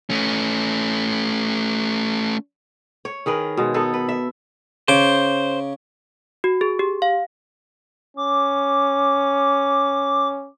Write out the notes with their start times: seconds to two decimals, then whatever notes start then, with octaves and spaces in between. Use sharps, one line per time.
0.10 A3 C#4
3.05 C#5
3.26 D#3 G#4 A#4 B4
3.57 B2 G#3
3.74 B3 D#4 A4
3.94 B4
4.09 E5
4.88 C#3 C5 D6
6.44 F#4
6.61 G#4
6.79 G4
7.02 F5
8.17 C#4 D6